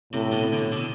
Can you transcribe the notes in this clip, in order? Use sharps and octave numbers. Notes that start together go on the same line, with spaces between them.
A2 C3
B2 D3
B2 D3
B2 D3